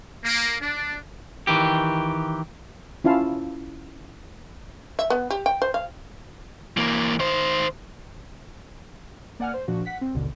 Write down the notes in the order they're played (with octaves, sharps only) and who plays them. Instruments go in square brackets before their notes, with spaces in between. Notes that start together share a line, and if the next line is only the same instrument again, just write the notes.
[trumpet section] A#3
D4
[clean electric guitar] D#3 E3 G4
[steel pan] C#4 E4 F4 F5 A5
[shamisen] E5
B3
G4
G5
C5
F5
[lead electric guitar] E3 A#3
D#3 C5
[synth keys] A#3 D5 F#5 G#5 F6
C5
A#2 F3 D4 F#4
F#5 B6
C4
A1 D#2 B2 D3